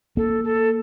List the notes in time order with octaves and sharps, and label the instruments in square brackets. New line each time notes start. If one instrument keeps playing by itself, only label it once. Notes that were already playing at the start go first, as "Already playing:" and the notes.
[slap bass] A#3 [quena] A4
[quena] A4